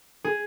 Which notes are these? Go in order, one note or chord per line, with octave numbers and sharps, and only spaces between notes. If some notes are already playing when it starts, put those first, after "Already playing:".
G#4